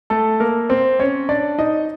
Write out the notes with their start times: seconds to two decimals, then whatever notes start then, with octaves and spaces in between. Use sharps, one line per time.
0.10 A3 A4
0.40 A#3 A#4
0.69 C4 C5
0.99 C#4 C#5
1.29 D4 D5
1.58 D#4 D#5